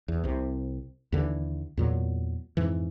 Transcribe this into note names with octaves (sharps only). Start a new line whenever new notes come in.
E2
C2 C3
D#2 D3 E3
E2 A#2 F#3
F2 G#2 E3